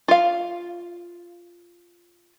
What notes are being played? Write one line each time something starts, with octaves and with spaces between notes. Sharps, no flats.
F4 F5